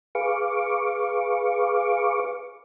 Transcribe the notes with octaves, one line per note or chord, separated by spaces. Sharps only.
G#4 B4 F5 C#6 D6